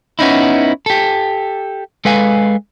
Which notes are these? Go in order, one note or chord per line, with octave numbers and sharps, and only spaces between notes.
B3 C#4 D#4 E4
G4 A4
G#3 A4 B4 F5 G#5